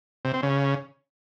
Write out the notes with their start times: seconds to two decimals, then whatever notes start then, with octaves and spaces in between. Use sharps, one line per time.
0.25 C3
0.34 C4
0.43 C#3